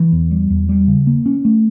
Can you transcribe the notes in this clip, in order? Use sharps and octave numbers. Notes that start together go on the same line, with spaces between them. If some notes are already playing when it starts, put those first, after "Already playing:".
Already playing: E3
E2
G3
E2
G3
C#3
A#3
C#4
A3